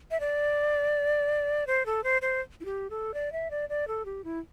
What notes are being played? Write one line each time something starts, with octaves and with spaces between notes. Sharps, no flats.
E5
D5
C5
A4
C5
C5
E4
G4
A4
D5
E5
D5
D5
A4
G4
E4